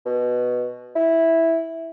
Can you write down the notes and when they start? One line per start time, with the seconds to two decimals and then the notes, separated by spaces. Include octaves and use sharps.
0.06 B2
0.96 E4